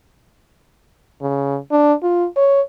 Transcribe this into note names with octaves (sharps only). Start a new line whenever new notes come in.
C#3
D4
F4
C#5